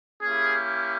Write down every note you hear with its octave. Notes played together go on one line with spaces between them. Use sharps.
A#3 C#4 E4 G4 G#4